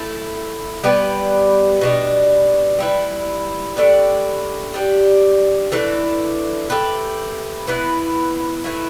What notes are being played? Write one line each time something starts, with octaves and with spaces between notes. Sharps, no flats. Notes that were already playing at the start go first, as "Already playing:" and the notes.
Already playing: A3 E4 A4
G3 B3 G4 B4
B2 G3 D4
G3 E4 B4
A3 D4 G4 B4
G3 D4 G4
E3 A3 D4 A4
A3 G4 B4
E3 B3 E4 B4
E3 A3 E4